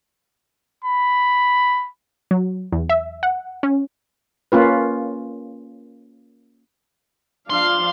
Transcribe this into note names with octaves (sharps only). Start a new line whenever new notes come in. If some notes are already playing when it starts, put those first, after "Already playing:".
B5
F#3
E2
E5
F#5
C#4
A#3 C#4 F4 B4
F3 D4 F5 C6